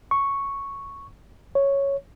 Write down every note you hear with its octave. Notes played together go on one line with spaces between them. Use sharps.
C#6
C#5